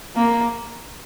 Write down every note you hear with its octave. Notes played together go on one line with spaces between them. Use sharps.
A#3